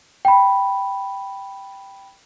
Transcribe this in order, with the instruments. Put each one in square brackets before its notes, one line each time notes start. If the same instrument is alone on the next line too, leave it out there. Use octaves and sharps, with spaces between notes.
[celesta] G5 B5